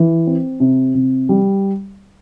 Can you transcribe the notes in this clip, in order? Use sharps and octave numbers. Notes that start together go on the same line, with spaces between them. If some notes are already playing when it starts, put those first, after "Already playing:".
Already playing: E3
C4
C3
C3
G3